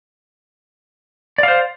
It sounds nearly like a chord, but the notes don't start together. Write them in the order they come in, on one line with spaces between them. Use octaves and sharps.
D5 F5 C5